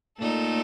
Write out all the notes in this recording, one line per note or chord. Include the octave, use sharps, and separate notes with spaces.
A#2 A3 D#4 A4